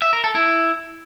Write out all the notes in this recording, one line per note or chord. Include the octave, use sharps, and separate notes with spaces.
E5
A#4
A4
E4